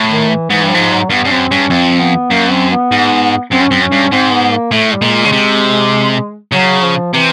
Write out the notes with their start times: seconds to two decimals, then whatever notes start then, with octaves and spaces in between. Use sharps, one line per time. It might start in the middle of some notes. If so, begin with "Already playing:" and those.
Already playing: A2
0.10 D#3
0.30 E3
0.50 G#2 E3
0.62 G2
0.70 G#2 F3
0.91 F#3
1.10 G2 B3
1.25 G2 C#4
1.30 F#2 C4
1.51 G2 C#4
1.70 F2 C4
2.01 B3
2.31 F#2 A#3
2.51 C4
2.71 B3
2.91 G#2
3.51 F#2 C4
3.61 C#4
3.70 F#2 C4
3.82 C#4
3.92 G2
4.12 G#2 C4
4.32 B3
4.52 A#3
4.72 A2 A3
4.94 G3
5.02 A#2 G#3
5.25 C#3
5.32 C3
6.53 C#3 F#3
6.83 F3
7.14 C3 E3